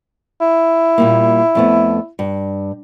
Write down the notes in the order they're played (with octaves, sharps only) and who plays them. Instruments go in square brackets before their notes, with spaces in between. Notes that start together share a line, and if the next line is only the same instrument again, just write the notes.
[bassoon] E4
[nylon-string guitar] A#2 G3 A#3
F2 A3 B3
G2